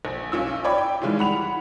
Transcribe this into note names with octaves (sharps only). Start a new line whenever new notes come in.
A#1
B1 C#4 F4 E6
C#5 D5 G5 B5
G5
D#3 E3 G3 G#3 E4 F4
F#5 B5 F7